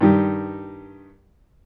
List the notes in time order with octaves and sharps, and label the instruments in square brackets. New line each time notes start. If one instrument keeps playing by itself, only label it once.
[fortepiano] G2 D#3 G4